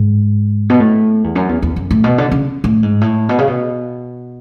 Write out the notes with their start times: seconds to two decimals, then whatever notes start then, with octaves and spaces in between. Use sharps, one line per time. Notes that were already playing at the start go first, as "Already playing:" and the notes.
Already playing: G#2
0.70 B2
0.80 A2
1.24 E2
1.35 F#2
1.49 E2
1.62 E2
1.76 F#2
1.91 A2
2.04 B2
2.18 D3
2.32 C#3
2.64 A2
2.83 G#2
3.01 A2
3.29 B2
3.38 C#3
3.48 B2